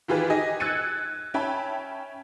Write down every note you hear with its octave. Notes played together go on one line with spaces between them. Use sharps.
D#3 E3 F4 G4 G#4 B4
D#4 G4 G#4 D#5 G#5
E6 F#6 G#6 A6 C#7 D#7
C#4 E5 G5 A5 B5